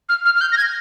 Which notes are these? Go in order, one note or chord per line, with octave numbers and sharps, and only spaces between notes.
F6
F6
F6
G6
A#6
G#6